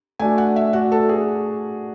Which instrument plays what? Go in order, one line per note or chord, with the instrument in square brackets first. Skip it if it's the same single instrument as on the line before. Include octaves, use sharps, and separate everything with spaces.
[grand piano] A3 D4 F#4 [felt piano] G#5
[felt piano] F#5
E5
[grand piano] A3 D4 F#4 [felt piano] F#5
[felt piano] A4
G#4